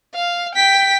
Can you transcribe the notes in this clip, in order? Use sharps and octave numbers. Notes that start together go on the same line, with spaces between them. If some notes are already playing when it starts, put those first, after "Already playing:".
F5
G5 B6